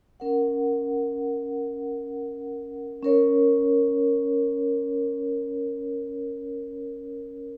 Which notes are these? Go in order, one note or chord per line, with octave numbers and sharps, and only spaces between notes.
C#4 A#4 F#5
C#4 A#4 C#5